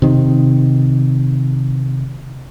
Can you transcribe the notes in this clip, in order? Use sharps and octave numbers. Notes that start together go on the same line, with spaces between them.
C3 D#3